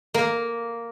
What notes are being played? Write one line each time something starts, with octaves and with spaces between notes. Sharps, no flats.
A#3